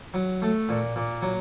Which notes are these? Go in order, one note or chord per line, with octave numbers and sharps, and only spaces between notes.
F#3
A3
A#2
A#2
F#3